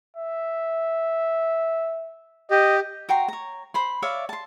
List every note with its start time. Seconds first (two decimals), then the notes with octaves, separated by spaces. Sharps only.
0.17 E5
2.51 G4 D#5
3.09 F#4 G5 A#5 C6
3.28 C#5 A#5
3.74 C5 B5 C6
4.02 C#5 D5 E5 F5
4.29 A5 C6